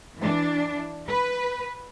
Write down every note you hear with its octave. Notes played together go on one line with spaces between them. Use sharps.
E3 D4
B4